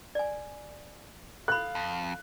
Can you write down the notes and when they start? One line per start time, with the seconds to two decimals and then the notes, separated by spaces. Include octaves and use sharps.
0.15 D5 G#5
1.48 A4 F5 B5 F#6
1.75 F2